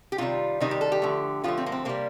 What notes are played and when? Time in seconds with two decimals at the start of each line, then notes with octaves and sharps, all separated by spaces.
0.12 G4
0.18 C3 D#3 G3 F4
0.60 C3 D#3 G3 D#4
0.71 G4
0.81 A4
0.92 G4
1.02 D3 F3 A3
1.43 D3 F3 A3 F4
1.58 C4
1.66 A#3
1.72 C4
1.85 C3 G3 A#3